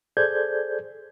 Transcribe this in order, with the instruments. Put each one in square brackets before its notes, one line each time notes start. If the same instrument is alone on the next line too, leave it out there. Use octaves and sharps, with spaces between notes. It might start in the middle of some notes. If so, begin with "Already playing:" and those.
[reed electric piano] G#4 A4 C5 D5 G6 G#6